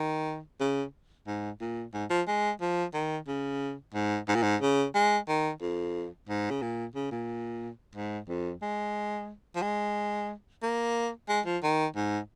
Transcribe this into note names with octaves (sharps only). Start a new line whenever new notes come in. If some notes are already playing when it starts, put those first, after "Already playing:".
Already playing: D#3
C#3
G#2
A#2
G#2
F3
G#3
F3
D#3
C#3
G#2
G#2
A#2
G#2
C#3
G#3
D#3
F2
G#2
C#3
A#2
C#3
A#2
G#2
F2
G#3
F3
G#3
A#3
G#3
F3
D#3
G#2